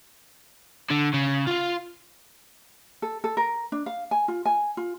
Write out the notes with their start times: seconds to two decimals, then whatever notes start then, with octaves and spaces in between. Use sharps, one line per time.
0.90 D3
1.13 C#3
1.47 F4 F5
3.02 A4
3.24 A4
3.37 A#4
3.72 D4
3.86 F5
4.11 G#5
4.28 F4
4.45 G#5
4.77 F4